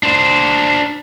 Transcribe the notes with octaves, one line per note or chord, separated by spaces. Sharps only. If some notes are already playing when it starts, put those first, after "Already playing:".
D4 C5